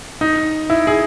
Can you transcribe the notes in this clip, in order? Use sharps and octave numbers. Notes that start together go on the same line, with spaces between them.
D#4
E4
G#4